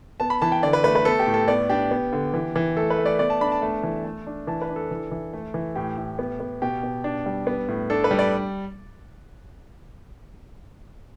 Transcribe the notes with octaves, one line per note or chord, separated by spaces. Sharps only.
B3 A5
B5
E3 A5
G5
D3 D5
B4
A3 B4
B4
B3 A4
G4
A2
A4
B3 D5
D4 G4
B3
D3
E3
E3
A3 A4
B4
A3
D5
B3 D5
A5
D4 B5
A5
A3
E3
A3
D4
E3 A5
B4
D4
A4
E3
E3
A3
E3
A2 G4
A2
B3
B3
B2 G4
B2
D4
G3
B3
A2
D4 A4
B4
G3
D5